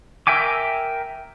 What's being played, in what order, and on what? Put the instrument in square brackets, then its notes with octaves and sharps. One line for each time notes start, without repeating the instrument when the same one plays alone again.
[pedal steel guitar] A#4 E5 G5 G#5 D6